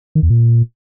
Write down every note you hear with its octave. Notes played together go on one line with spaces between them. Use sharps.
D#3
E2
A#2